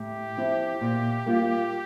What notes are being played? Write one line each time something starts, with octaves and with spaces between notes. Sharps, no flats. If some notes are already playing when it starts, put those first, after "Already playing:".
Already playing: A2 G4
F3 C4 E4
A#2
G3 A#3 F4